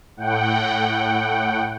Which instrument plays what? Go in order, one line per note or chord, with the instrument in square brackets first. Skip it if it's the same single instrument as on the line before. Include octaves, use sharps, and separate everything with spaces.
[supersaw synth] A2 F#5 G5